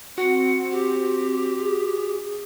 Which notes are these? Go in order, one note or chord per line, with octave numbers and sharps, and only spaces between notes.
C4 F#4 F#5
G4
G#4